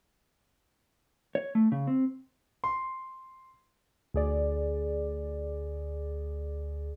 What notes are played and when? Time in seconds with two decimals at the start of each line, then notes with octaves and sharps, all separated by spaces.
1.35 C#5
1.55 A3
1.72 C#3
1.87 C4
2.64 C6
4.14 D2 G#4 D5